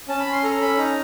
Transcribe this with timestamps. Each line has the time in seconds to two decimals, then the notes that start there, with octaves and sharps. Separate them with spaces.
0.08 C#4 A5
0.20 B5
0.26 C#4
0.32 C6
0.43 A4 A#5
0.61 C#4 B5
0.78 D#4 A#5